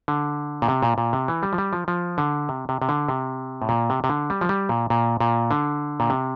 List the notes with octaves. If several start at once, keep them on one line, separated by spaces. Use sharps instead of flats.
D3
A#2
C3
A#2
A#2
C3
E3
G3
F3
G3
F3
F3
D3
C3
C3
C3
D3
C3
A2
A#2
C3
C3
D3
G3
F3
G3
A#2
A#2
A#2
D3
A#2
C3